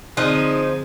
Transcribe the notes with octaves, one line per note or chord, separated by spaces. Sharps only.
D3 F3 C4 D#4 G#4